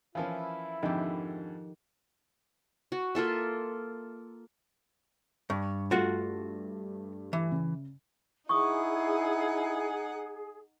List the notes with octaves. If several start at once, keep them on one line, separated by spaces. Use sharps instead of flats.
E3 F3 C#4 E4 A#4 F5
F2 G#2 D3 D#3 F3 G4 A4
F#4
A#3 F4 A4 E5
G2 C#6
G2 A3 F4 F#4 F#5
E3
C#3
D#4 E4 G#4 F#5 C#6 D#6